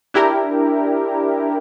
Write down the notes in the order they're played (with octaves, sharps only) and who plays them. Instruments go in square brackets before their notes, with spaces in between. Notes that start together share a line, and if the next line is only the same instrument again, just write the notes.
[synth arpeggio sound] D4 E4 G4 A#4